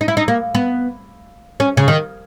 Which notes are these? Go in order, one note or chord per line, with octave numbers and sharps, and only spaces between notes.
D#4
E4
D#4
A#3
B3
C#4
C#3
D#3